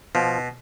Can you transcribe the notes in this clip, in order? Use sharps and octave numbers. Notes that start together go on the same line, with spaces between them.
B2 F3